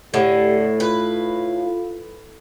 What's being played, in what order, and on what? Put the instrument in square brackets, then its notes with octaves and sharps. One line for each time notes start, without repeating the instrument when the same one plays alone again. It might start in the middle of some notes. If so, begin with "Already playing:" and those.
[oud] A2 [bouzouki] D3 [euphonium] G4
[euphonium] F4 [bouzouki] B4